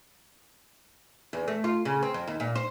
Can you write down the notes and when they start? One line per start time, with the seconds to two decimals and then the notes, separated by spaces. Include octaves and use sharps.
1.33 E2
1.48 A3
1.64 F4
1.85 C#3
2.03 C4
2.14 F2
2.27 D#2
2.40 A#2
2.55 C5